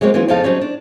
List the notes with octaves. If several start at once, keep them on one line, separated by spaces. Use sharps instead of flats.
F#3 G#3 A#3 C4 C#5
E3 F#3 B3 C#4 F4
F2 C#3 F3 D#4 F5 A5
F#3 G3 C4 C#4 D#4
D4